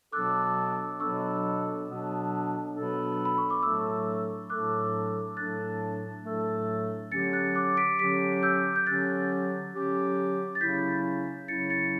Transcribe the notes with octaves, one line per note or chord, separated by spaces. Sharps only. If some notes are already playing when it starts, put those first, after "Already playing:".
B2 F#3 B3 D4 A4 D6 F#6
B2 F#3 B3 D4 A4 C#6 E6
B2 F#3 B3 D4 A4
B2 F#3 B3 D4 A4
B5
C#6
D6
A2 F#3 A3 D4 A4 C#6 E6
A2 F#3 A3 D4 A4 D6 F#6
A2 F#3 A3 D4 A4 F#6 A6
A2 F#3 A3 D4 A4
D3 F#3 C#4 G4 A6 C#7
F#6 A6
D6 F#6
B6 D7
D3 F#3 C#4 G4 B6 D7
E6 G6
G6
D3 F#3 C#4 G4 F#6 A6
D3 F#3 C#4 G4
A6
C#3 F#3 C#4 E4 G6 B6
C#3 F#3 C#4 E4 A6 C#7
A6 C#7